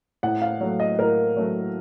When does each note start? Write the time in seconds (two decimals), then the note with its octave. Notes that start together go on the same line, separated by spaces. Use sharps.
0.23 A2 F#5
0.42 F5
0.61 F#3 A3
0.80 D#5
0.99 A2 A#4
1.36 F#3 A3